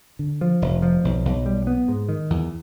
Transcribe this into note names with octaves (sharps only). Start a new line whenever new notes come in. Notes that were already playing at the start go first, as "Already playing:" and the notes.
D3
F3
F1
F3
B1
B1
G3
B3
G#2
D#3
E2